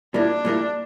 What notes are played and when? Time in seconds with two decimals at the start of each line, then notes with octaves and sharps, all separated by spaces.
0.14 A#2 G3 A#3 D4 E4
0.45 A#2 G3 A#3 E4